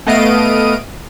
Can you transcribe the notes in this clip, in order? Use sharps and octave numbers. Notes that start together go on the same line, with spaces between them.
A3 B3 D#5 F5 D7 D#7